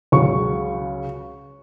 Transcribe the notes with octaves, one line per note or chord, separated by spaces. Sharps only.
C#2 C#3 F#3 C#6